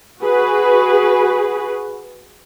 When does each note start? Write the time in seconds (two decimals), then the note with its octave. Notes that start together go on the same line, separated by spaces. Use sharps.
0.22 F#4 G#4 B4